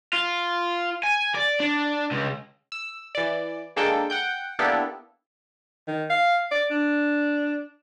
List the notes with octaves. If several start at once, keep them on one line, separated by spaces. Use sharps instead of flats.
F4
G#5
D5
D4
C#2
E6
E3 D5
G#3 A#3 D4 A4 G5
F#5 G5 G6
A#3 B3 D4 E4 G4 A4
D#3
F5
D5
D4